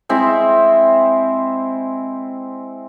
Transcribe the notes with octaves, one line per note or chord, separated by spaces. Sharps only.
G#3 C4 E4 E5